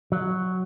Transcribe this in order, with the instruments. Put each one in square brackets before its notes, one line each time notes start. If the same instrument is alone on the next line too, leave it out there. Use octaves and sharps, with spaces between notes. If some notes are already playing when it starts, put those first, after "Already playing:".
[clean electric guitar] F#3